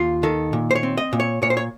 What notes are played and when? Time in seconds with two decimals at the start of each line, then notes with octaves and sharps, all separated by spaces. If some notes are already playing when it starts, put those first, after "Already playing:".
Already playing: D#2 F4
0.23 D#3 A4
0.53 A#2
0.71 C5
0.75 C#5
0.83 C4
0.98 D#5
1.13 A#2
1.20 C#5
1.42 A#2 C#5
1.50 C5
1.57 C#5